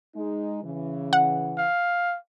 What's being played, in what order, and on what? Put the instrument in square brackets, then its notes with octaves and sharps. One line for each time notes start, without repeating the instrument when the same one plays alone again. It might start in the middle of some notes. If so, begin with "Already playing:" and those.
[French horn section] G#3 D#4
C#3 E3
[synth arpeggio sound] F#5
[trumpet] F5